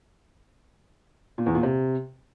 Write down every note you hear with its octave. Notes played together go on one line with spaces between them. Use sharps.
A#2
E2
A#2
C3